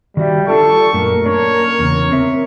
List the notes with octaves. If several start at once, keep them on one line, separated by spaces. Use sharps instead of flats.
D#3 G3 F#4 E5
D4 F4 G4 A4 C#6
F#2 A#2 A3 A#4
A#3 C#4 D4 C#5
E2 C#3
C4 E5